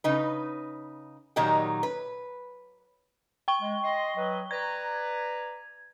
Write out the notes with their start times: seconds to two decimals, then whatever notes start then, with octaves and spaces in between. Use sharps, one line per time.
0.04 C#3 D#4 B4
1.36 A#2 D#3 F#3 D#4 G4
1.83 B4
3.48 G5 C#6 G7
3.61 G#3
3.83 D#5 C6
4.16 F#3 B4 D#5
4.51 B4 D5 A#5 G#6